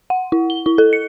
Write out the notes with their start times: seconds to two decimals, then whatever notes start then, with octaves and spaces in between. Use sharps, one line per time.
0.10 F#5
0.32 E4
0.50 G7
0.66 E4
0.78 A4
0.93 C#7